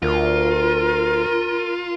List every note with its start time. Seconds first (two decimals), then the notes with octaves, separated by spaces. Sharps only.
0.02 D2 F4 A#4